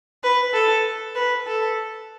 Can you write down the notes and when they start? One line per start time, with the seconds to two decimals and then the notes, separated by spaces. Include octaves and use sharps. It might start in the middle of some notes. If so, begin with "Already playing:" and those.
0.23 B4
0.54 A4
1.16 B4
1.47 A4